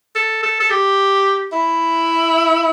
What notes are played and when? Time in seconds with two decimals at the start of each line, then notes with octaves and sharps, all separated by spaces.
0.15 A4
0.43 A4
0.60 A4
0.70 G4
1.52 E4